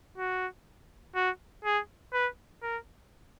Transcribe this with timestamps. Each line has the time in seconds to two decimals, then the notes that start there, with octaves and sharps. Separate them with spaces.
0.18 F#4
1.15 F#4
1.65 G#4
2.13 B4
2.63 A#4